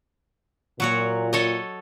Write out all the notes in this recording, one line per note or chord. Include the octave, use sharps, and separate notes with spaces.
A#2 F#3 F#4 C#5
A4 C#5 D#5